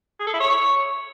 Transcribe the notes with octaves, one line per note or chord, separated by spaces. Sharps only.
G#4
A4
E4
C#5